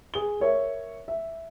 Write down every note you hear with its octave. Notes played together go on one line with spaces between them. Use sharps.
G#4 G7
A#4 C#5 D5 E5
E5